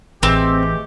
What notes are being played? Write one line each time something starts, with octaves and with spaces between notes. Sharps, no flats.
A1 E3 G#3 A3 C4 G4